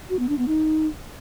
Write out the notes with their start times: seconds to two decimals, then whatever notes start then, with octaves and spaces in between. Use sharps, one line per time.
0.10 F#4
0.19 B3
0.29 D4
0.38 B3
0.48 D#4